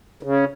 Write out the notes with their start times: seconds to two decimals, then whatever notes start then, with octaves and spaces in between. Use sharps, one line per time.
0.23 C#3